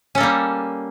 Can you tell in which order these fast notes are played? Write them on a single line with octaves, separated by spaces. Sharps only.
C#4 A4 A#3 G3